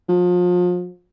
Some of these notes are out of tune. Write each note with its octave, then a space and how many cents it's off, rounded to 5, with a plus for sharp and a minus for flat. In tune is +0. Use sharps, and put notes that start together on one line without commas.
F3 +35